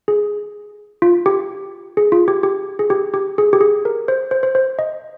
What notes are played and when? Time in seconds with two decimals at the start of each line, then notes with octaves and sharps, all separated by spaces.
0.08 G#4
1.02 F4
1.26 G4
1.97 G#4
2.12 F4
2.28 G4
2.43 G4
2.79 G#4
2.90 G4
3.14 G4
3.38 G#4
3.53 G4
3.61 G#4
3.85 A#4
4.08 C5
4.31 C5
4.43 C5
4.55 C5
4.79 D#5